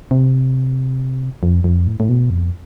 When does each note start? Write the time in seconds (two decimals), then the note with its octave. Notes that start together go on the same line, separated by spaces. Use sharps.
0.11 C3
1.43 F2
1.64 F2
1.87 A2
2.00 A2
2.09 B2
2.30 F2